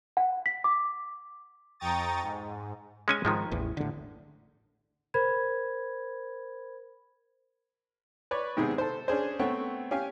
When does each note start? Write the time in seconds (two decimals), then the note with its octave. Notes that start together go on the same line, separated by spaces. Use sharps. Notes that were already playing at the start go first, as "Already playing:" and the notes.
0.17 F#5
0.46 B6
0.64 D6
1.80 F2 G5 A#5 C#6 D#6 A6
2.22 G#2
3.08 G#3 C#4 G#5
3.25 G#2 D#3 F3 G#3
3.51 A1 E2 E3
3.77 A2 D3
5.14 A#4 C5 B5 G#6
8.31 B4 C#5 D5
8.57 G#2 C3 D#3 B3 G#4
8.78 A4 C5
9.08 C#4 D4 G#4 C5
9.39 A3 B3 C4 C#5 F#5 G5
9.91 C#4 G4 F5 G#5